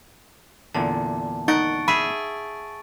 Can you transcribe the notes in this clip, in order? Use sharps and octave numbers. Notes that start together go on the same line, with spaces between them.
E2 A#2 D3 A5
D#4 F#5 C#6 A6 D7
G#4 E5 B5